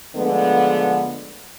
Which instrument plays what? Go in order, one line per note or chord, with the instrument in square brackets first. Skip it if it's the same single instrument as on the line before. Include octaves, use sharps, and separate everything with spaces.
[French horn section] D3 F3 G#3 A3 B3